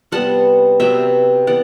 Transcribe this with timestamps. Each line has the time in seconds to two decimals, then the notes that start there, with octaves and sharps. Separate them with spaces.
0.12 C3 G3 B3 F#5 A5
0.80 C3 F#3 B3 E5 G5
1.47 E3 B3 D5 F#5